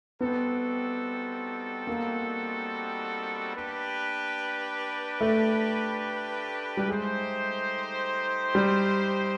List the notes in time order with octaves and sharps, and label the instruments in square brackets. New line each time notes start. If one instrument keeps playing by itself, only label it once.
[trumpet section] G3 C4 D#4 F#4 A4 [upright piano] B3
[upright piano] A#3
[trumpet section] D4 G4 B4
[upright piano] A3
G3
[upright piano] G#3 [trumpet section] D#4 G4 C5
[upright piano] G3